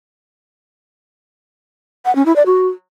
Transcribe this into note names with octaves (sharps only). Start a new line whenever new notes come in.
F#5
C#4
E4
D5
F#4